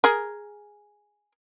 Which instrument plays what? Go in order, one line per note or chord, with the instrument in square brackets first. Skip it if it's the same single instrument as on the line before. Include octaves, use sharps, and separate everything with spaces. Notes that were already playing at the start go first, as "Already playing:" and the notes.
[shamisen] G#4 A#4